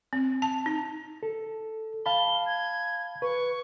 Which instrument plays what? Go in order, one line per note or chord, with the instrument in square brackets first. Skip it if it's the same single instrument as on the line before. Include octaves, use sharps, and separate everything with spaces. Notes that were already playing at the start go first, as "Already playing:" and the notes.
[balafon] C4
A5
D#4
[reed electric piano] A4
[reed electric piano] F5 A5 B5 [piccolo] G7
[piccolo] G#6
[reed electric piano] B4 [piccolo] C#6